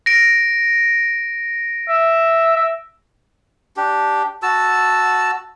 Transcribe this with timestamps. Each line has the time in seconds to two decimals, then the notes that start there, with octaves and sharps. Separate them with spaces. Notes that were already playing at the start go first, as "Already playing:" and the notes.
0.06 A#6 D7
1.89 E5
2.56 E5
3.77 D4 G4
4.43 F#4 A5 E6